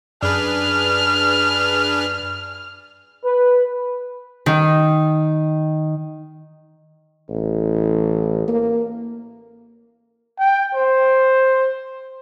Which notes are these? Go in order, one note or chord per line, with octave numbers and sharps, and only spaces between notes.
F#2 D4 G#4 B4 F6
B4
D#3
A1
A#3
G5
C5